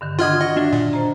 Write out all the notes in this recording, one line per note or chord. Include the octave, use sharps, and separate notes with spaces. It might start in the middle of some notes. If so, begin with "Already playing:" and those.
G2 D3 D#3
D3 F4 D#5 F#5 F6 G#6
F#4 D#5
D4 F4 E5 F#5
A#2
C5 A#5